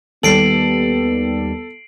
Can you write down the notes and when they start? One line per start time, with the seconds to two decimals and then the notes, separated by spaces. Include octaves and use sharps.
0.23 D#2 G3 B3 A4 C7 D7 F#7